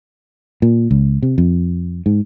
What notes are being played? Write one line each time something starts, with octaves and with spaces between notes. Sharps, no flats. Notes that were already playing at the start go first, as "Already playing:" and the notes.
A#2
C#2
C3
F2
G#2